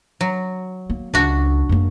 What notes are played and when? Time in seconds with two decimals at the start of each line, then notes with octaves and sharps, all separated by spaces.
0.21 F#3
0.90 A#3
1.14 C#2 D4 F#4
1.69 F#2 A#3